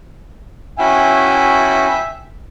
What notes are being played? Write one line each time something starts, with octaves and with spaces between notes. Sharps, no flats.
C#4 E4 F#4 E5 G5 G#5